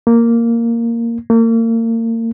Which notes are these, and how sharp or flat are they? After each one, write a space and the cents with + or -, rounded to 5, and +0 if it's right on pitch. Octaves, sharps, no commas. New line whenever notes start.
A#3 -5
A#3 -35